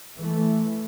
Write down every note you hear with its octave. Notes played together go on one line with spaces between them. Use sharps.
E3 A3